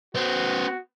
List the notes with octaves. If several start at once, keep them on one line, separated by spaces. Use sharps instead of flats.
B3 F#4 C5